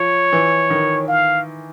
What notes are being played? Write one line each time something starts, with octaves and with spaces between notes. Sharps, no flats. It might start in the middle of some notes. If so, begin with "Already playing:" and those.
Already playing: F3 C#5
E3
D#3
F5